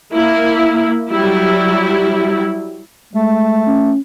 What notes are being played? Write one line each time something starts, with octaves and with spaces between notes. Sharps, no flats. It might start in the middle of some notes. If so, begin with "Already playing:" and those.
A#3 E4
F#3 G3 E4
G#3 A3
C#4